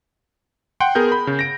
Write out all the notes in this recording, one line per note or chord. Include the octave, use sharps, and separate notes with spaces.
F#5 G5 C6
B3 G#4 A#4 G6
B5
C#3
A#6 D7